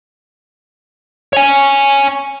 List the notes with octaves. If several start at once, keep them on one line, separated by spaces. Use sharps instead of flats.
C#5 G#5